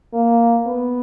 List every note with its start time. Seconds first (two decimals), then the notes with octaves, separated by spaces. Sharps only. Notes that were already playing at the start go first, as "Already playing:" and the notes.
0.14 A#3
0.66 B3